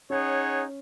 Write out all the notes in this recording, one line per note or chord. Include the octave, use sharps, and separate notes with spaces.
C#4 D#4 G#4 C#5 F#5